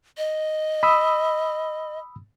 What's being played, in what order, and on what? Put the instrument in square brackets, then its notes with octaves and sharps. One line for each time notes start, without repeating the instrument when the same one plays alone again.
[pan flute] D#5
[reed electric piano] B5 D#6 E6